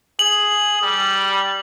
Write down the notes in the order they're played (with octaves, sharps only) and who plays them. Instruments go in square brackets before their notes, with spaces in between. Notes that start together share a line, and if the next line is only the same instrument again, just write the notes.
[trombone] G#4 [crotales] F#7
[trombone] G3